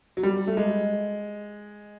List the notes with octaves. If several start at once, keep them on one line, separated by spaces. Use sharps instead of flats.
F#3
G3
A3
G#3